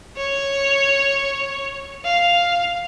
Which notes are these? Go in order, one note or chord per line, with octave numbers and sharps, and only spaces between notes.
C#5
F5